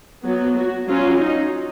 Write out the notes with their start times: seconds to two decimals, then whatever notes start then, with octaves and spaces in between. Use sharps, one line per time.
0.24 F#3 B3
0.57 F#4
0.88 F#3 C#4 F4
1.21 D#4